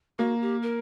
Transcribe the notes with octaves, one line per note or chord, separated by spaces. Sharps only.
A#3 F#4
G4
A#4